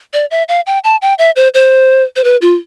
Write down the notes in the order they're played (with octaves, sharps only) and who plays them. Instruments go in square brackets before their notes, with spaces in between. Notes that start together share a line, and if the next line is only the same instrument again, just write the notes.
[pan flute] D5
E5
F5
G5
A5
G5
E5
C5
C5
C5
B4
F4